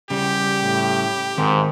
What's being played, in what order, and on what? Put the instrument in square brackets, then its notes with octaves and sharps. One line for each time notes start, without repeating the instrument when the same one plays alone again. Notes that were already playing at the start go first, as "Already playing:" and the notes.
[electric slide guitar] C#3 G3 [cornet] G4
[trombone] A2
[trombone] G#2 [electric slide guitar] D#3 C4 A#4